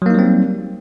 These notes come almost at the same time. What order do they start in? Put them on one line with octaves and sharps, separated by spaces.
F#3 A#3 D#4 G3 C4